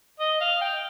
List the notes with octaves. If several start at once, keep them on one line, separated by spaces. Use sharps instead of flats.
D#5
F5
G5